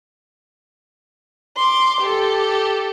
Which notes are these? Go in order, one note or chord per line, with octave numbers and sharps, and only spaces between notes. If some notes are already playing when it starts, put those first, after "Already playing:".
C6 D6
G4 A4